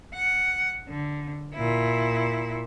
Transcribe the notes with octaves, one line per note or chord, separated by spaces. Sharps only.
F#5
D3
A#2 E4